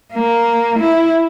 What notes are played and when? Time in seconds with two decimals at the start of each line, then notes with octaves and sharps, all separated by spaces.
0.13 A#3
0.79 E4